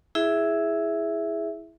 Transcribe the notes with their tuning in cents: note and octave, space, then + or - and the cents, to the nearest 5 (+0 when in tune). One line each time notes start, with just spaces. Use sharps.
E4 -5 G#4 +0 E5 +0